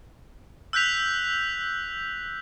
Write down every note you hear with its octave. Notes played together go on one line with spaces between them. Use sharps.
E6 F#6 G6 B6 F7